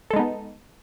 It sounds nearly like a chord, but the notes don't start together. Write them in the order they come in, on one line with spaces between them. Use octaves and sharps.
A4 G#3 D#4 B3